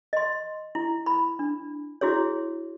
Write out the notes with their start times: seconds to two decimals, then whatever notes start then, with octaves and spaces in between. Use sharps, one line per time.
0.13 D#5 C6
0.75 E4
1.06 B5
1.39 D4
2.01 E4 F#4 G#4 C#5